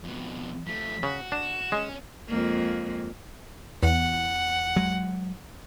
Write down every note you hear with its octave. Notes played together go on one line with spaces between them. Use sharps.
F2 B2
F3 A3 B6
C#3 F#4
D4 E7
G#3 C#4
F2 G#3 A#3
E2 F#5
F#3 G#3